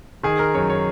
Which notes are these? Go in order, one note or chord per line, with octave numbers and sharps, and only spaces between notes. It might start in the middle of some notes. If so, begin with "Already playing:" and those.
D#3 G#4
A#4
F#2 C#5
C#5